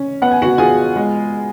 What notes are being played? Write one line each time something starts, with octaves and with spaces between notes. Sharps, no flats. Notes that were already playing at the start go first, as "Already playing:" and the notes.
Already playing: C#4
B3 F#5
G#5
F#4 F#5
F4 G#4 G#5
G#3